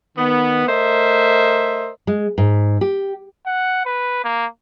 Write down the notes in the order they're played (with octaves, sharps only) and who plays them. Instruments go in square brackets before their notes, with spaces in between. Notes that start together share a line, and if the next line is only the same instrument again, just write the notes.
[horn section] D#3 B3
A3 A#4 C5 D#5 E5
[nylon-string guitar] G#3
G#2
G4
[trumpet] F#5
B4
A#3